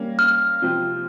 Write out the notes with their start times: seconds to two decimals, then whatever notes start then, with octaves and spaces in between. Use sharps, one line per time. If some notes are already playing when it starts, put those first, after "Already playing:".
Already playing: G3 A#3 C#4
0.19 F6
0.62 C3 F3 C4